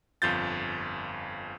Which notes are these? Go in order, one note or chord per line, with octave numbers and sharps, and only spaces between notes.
G1 F2 F4 G6 A6